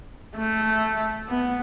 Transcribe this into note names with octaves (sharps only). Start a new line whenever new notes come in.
A3
B3